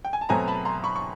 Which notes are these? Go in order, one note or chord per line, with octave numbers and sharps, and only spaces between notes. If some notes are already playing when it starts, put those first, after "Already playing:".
G5
G#5
A5
B2 F#3 A3 C4 G#5 A#5
A5 B5
A#5 C6
B5 C#6
C#6